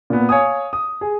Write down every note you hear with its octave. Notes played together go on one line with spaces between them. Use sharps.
A#2 B3
C#5 F5 G#5 D#6
D#6
G#4